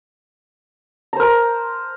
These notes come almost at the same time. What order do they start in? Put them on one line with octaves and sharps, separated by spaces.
A#5 C5 A#4